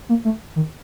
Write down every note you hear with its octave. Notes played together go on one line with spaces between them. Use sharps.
A#3
A3
D#3